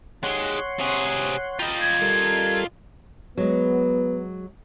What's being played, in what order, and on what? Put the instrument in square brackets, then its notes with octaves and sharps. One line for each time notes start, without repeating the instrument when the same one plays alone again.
[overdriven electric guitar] D#2 G#3 [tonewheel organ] C#5 F#5 C6
[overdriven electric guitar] C3 G#4
[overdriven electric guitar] F4 D#5 [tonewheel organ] G5 A#5 B5
[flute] G#6
[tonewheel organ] G3 A4 A#4
[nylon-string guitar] F#3 G#3 [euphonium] B3